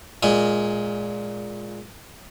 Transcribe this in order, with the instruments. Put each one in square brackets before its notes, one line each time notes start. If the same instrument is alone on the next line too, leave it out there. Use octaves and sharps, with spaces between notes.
[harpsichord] A#2 G#3